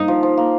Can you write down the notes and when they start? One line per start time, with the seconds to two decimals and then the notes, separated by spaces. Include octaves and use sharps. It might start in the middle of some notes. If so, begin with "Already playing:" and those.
Already playing: A#3 D#4
0.08 F3
0.23 F3
0.37 A#3